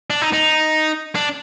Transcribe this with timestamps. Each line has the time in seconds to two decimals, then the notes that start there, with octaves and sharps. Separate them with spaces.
0.10 D4
0.22 D#4
0.33 D#4
1.15 D4